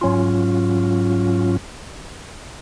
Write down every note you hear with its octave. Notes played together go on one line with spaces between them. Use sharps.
G#2 F#3 C#4 F4